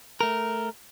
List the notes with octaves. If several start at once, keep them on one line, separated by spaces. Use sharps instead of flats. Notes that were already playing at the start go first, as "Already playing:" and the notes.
A3 A#4